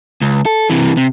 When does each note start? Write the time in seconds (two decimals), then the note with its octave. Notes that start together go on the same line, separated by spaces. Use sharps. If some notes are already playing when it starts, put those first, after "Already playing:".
0.21 C#2
0.46 A4
0.70 C3 E3
0.97 C3